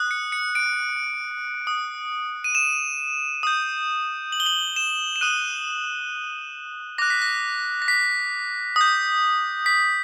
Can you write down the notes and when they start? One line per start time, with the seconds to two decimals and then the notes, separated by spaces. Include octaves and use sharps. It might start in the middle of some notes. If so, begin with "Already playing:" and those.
Already playing: D#6 F#6
0.11 C#7
0.32 C#7
0.55 D7
1.66 D#6 F#6
2.44 D#7
2.55 E7
3.43 D#6 G6
4.32 F#7
4.40 G7
4.46 F#7
4.76 E7
5.16 E7
5.21 D#6 F#6 D#7
6.98 D6 F#6 A#6
7.10 B6
7.22 A#6
7.82 A#6
7.88 B6
8.76 D#6 G6
9.66 B6